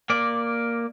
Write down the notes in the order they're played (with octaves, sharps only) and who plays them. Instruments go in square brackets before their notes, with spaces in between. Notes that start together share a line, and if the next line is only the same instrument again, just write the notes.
[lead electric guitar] A#3 D5